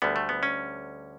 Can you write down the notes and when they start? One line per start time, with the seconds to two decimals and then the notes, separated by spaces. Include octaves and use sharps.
0.02 D2 D3 G3 B3
0.16 A3
0.29 B3
0.43 C#4